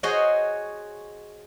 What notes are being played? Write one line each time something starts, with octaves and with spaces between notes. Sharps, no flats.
F#4 G#4 C5 C#5 D#5 F#5